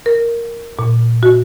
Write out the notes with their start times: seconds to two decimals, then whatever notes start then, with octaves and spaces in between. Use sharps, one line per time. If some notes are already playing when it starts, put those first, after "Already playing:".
0.06 A#4
0.79 A#2
1.23 F#4